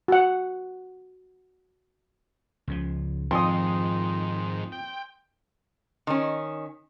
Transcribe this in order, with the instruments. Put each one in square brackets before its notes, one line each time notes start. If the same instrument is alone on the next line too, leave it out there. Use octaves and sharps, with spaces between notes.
[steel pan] F#4 F#5
[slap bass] C#2 C#3 F3
[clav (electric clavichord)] F2 [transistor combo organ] G#2 D#3 [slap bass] F3 [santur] C6 D#6
[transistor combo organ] G5
[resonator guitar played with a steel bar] D#3 C#4